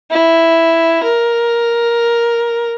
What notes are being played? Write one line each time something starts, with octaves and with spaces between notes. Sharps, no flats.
E4
A#4